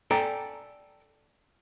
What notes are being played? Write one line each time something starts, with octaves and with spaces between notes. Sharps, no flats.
A4 D5 G5 G#5 A#5